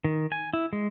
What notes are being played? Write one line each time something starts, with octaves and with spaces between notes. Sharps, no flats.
D#3
G#5
E4
G#3